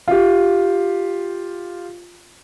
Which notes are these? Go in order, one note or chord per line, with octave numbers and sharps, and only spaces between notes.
F4 G4